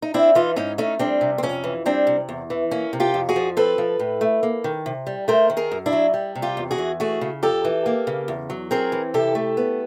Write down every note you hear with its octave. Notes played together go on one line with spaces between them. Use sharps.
D#4
C4 D4 E4
E3 D#4 F4
G#2 C#4 D#4
A3 C#4 D#4
G3 C4 D4
C3
C4
F2 C#4
E3
G3 C4 D4
C3
E2
E3
A#3 C#4
C3
F4 G4
F2
F#4 G#4
F3
C4 A4 B4
F3
A2
A3
A#3
D#3
C3
G3
A3 A#4 C5
D#3
G#4 A#4
F#2
D4 E4
F#3
G3
C3
F4 G4
E2
F#4 G#4
E3
A3 F#4 G#4
C#3
F2 G4 A4
E3
A#3
C#3
E2
F#3
C4 G#4 A#4
E3
C3 G4 A4
A3
B3